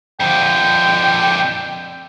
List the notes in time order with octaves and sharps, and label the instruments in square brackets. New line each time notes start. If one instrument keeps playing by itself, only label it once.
[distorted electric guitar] F2 D3 [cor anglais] G5